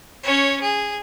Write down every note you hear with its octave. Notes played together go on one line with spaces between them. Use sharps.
C#4 C#5
G#4